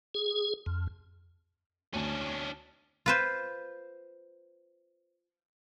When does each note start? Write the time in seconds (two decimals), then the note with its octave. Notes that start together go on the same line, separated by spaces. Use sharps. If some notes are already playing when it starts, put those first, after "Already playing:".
0.15 G#4
0.66 F2
1.94 D2 C#4 D4
3.06 F4 B4 C5